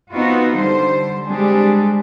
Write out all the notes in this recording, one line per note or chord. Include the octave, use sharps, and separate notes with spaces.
B3 C4 D#4 F4 F#4
D3 G3 C5
G3 G#3 C4 D4 G4 G#4